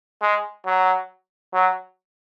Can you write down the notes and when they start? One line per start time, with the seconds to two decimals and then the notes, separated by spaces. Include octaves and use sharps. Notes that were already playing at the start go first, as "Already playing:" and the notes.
0.22 G#3
0.66 F#3
1.54 F#3